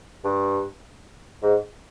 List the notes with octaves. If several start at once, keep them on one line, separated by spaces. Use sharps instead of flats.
G2
G#2